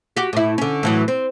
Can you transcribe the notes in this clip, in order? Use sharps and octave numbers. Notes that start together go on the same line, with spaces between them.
F#4 G4
A2 E4
D3 C#4
A2 E3 F#3
C4